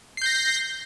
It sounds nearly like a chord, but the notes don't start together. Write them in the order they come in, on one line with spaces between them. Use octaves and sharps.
C7 G6 A#6